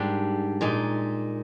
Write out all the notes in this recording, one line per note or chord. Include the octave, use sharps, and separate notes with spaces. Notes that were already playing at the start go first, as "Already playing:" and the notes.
Already playing: G#2 G3 A#3 D4
A#2 G#3 D#4